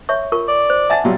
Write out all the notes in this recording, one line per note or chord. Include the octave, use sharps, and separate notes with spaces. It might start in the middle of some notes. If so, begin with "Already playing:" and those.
C#5 E5 C#6
F4 A#4 C#6
D5
C5
E5 F#5 G#5 A5 A6
A#2 F#3 G3